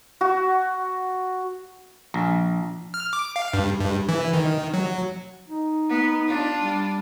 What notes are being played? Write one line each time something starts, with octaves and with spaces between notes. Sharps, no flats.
F#4
A#1
F6
D6
F5
G2
G2
E3
D#3
F#3
D#4
B3
D4 F4
G3